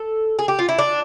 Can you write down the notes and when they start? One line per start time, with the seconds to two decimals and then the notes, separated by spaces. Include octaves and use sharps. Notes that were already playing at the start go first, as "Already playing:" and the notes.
Already playing: A4
0.39 G#4
0.48 G4
0.59 F4
0.69 E4
0.79 D4